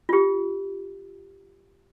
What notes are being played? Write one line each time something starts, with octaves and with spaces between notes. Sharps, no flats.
F4 G4